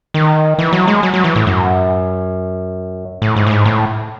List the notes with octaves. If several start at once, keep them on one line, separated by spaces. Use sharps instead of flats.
D#3
E3
F#3
G#3
F#3
F#3
E3
A2
F#2
A2
G#2
A2
G#2
A2